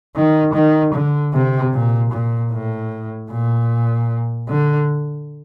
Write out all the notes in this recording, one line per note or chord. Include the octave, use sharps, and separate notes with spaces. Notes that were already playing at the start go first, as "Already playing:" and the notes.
D#3
D#3
D3
C3
A#2
A#2
A2
A#2
D3